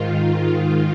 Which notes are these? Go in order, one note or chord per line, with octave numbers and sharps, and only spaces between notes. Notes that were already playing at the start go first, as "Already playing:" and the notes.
Already playing: G#2 D#3 F4